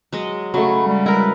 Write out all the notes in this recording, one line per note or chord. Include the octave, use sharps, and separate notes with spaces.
F#3 G#3 D#5
C#3 F#3 A3 B5
G3 G#3
E4 A#4 B4 A#5